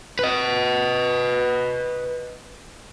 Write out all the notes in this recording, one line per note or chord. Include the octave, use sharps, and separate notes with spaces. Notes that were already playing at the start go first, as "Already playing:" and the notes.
B4 D#5